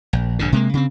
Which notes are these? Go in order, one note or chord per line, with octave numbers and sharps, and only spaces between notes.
A#1
A#1 G2 D3
C3 G#3 A#3
C#3 C4